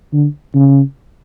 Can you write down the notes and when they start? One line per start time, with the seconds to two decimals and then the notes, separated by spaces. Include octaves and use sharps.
0.13 D3
0.55 C#3